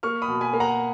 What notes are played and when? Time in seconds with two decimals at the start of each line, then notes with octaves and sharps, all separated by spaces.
0.03 A#3 C#6 F6
0.22 B5 D#6
0.28 B2
0.41 G#5 B5
0.53 A#3
0.60 F#5 A#5